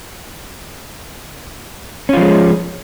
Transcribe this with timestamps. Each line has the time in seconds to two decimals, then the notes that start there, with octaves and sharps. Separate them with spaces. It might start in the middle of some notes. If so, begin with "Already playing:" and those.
2.09 C#4
2.13 F4
2.17 F3
2.21 G#3